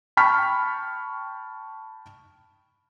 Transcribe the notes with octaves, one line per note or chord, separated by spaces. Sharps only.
G5 A5 B5 C#6 F6 B6